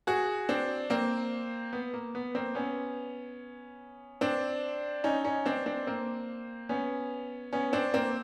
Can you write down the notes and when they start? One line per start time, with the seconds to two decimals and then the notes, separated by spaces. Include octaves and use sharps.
0.07 F#4 G#4
0.49 C4 D4
0.90 A#3 C4
1.73 B3
1.94 A#3
2.15 B3
2.35 A#3 C4
2.55 B3 C#4
4.21 C4 D4
5.04 C#4 D#4
5.24 C#4 D#4
5.46 C4 D4
5.66 C4 D4
5.87 A#3 C4
6.69 B3 C#4
7.53 B3 C#4
7.73 C4 D4
7.94 A#3 C4